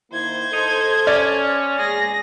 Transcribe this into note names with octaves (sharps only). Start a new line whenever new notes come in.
D#3 A#3 E4 C5 G#6
D#4 A4
C#4 D5
E2 A#2 G#3 G#4 A#6